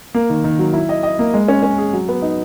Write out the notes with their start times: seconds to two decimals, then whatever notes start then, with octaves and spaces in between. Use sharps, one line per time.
0.15 A#3
0.30 D#3
0.44 D#3
0.59 F#3
0.73 E4
0.89 D#5
1.03 D#5
1.19 A#3
1.34 G#3
1.48 C#4
1.63 C#4
1.78 G#4
1.93 F#3
2.09 B3
2.22 D#4